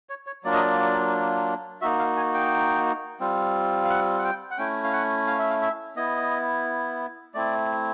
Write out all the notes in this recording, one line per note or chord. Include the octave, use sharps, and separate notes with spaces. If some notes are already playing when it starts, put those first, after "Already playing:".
C#5
C#5
F#3 A#3 D4 F4 D5
D#5
D5
A#3 D#4 F#4 E5
F5
G#5
G5
G3 C4 F4
F5
F#5
F#5
G5
F#5
A3 C#4 E4 G5
F5
F#5
F5
E5
F5
E5
B3 E4 D#5
A3 C4 E4 D5